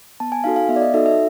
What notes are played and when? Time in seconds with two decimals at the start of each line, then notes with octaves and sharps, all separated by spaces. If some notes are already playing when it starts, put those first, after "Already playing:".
0.20 B3 A5
0.32 G#5
0.44 D#4 F#4 A4 F5
0.56 F5
0.69 B3 E5
0.76 D5
0.82 D#5
0.94 D#4 F#4 A4 E5
1.06 E5